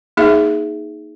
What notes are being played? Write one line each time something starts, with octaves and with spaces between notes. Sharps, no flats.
A#3 D#4 G#4 E5 F5